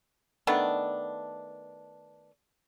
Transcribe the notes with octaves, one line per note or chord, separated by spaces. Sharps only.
D#3 A3 B3 D4